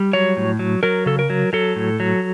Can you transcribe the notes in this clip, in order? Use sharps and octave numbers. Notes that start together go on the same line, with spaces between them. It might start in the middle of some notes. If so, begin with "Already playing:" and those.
Already playing: G3
F#3 C#5
A2
F#3
F#3 A#4
C#3 A4
A#4
F#3
F#3 A4
A2
F#3